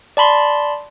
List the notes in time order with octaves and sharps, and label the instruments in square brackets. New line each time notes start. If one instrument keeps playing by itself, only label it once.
[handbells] D5 A5 B5 C6